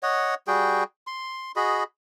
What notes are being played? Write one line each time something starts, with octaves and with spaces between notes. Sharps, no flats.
C#5 D#5 F#5
G3 F#4 G#4 G5
C6
F#4 G#4 D#5 B5